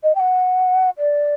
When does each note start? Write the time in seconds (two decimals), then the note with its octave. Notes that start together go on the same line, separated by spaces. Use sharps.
0.03 D#5
0.15 G5
0.20 F#5
0.99 D5